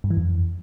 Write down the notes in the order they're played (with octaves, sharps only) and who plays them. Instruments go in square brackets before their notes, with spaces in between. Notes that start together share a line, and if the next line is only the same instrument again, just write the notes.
[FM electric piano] G2
E3
F2